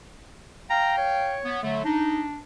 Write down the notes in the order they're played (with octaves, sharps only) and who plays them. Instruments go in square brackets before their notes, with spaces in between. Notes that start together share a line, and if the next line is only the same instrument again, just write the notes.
[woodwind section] F5 G5 [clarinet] A#5
[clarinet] C#5
[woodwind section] B3
D3 F#3 A3
[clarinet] D4 [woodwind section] D#4